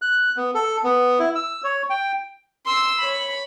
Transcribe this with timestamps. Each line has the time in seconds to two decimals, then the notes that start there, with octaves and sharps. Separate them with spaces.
0.02 F#6
0.37 B3
0.55 A4
0.84 B3
1.19 E4
1.35 E6
1.64 C#5
1.90 G5
2.66 C6 E6
2.99 C#5 B5